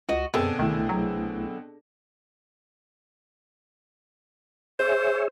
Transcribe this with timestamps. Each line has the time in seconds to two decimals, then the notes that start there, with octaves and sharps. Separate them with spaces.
0.09 C#2 F#4 D#5
0.34 F#2 B2 D3 C4 G#4
0.59 C2 D#3 A3 E4
0.89 F#3
4.79 G#4 C5 C#5 E5